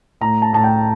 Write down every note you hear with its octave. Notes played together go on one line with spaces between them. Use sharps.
A2 A#5
A5
A2 A5
G5